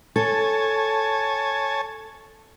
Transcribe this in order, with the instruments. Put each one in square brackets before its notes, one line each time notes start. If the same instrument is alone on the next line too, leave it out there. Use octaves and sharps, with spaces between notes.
[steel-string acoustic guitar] A4 [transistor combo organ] C#5 G#5 A5